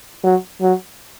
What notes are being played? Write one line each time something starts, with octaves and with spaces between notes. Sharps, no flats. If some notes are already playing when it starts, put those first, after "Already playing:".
F#3
F#3